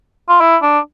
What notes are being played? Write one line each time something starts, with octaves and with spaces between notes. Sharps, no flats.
F4
E4
D4